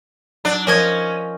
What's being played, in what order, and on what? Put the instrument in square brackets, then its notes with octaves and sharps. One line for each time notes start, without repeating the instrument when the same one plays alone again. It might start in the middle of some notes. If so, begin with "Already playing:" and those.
[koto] F#3 [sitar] D4
[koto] F3 D#5 [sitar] C#4 [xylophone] A#4 G#6